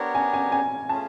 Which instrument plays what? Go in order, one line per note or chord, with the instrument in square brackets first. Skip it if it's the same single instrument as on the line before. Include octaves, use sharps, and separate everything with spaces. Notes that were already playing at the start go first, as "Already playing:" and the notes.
Already playing: [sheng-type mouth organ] B3 D4 G4 A#4 C#5
[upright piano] G#5
G#5
G#5
[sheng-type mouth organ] A3 C#4 F4 G#4 [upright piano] A5